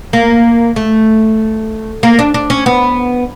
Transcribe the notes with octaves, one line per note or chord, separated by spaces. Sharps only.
A#3
A3
A#3
D4
D4
C#4
B3